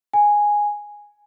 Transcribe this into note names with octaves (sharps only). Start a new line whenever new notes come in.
G#5